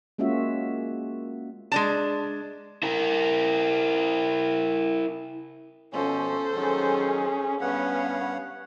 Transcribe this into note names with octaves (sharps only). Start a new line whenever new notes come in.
G#3 A#3 C#4 F4 F#4 E5
G#3 D4 A5
E4 A#4
B2 F3 C#4 A4 C5
D#3 F#3 C#4 G#4
G2 B3 C#4 C#5 F5 F#5